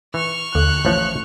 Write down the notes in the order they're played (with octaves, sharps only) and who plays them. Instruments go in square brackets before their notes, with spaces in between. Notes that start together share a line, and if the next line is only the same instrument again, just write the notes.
[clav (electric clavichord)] E3 [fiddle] C#6 F6
[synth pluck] D#2 D3 [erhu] F#6
[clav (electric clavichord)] A1 A2 F3